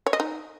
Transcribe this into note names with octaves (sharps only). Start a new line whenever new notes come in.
C#5
D#5
D#4